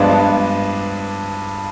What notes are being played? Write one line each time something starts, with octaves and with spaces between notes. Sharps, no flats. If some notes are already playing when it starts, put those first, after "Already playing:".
Already playing: G2 F3 G#3 B3 D4